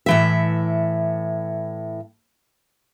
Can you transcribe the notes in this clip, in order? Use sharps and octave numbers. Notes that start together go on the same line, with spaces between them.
A2 E3 E5